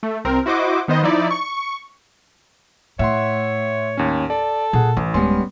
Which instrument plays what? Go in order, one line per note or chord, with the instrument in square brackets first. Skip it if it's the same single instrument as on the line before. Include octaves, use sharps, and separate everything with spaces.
[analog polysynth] A3
C2 C4 A#4
E4 F#4 C5 D#5 D6
D#3 B3 C5 D#5
F3 D#4 E4 D5
C#6
[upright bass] A2 [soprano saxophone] C#5 [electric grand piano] E5 F#5 C6
[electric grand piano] D#2 C#4
[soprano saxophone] A4 [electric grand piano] D5
[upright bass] A#2 [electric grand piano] G#4 F#5
[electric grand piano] A1 [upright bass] E3
[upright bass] D1 G#3 [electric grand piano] G3 B3 C6 [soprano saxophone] C#4